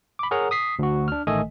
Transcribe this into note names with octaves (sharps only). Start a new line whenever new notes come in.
B5 D6
G#4 A#4 C#5 F#5 A#5
D#6 B6 C7
D2 F#4
D4 F6
A1 D#3 A3 A4 D#5 G#5